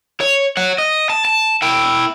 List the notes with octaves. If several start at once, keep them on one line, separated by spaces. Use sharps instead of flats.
C#5
C#5 F#5
D#5
A5
A5
E4 G5